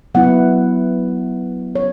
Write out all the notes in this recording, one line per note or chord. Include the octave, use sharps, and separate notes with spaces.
F#3 B3 E4 F#5
C#5